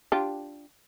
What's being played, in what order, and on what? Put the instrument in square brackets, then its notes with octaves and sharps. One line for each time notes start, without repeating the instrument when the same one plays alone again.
[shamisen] D4 F4 G4